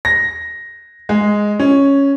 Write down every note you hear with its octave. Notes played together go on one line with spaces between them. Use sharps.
A#6
G#3
C#4